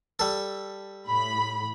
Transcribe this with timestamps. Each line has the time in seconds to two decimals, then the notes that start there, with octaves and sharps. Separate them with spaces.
0.19 G3 A4
1.07 A2 B5